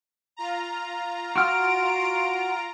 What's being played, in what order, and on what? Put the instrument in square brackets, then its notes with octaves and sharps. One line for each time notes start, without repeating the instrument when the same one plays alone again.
[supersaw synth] F4 A#5
[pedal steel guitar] F#4 F6 [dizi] C6 [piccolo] D7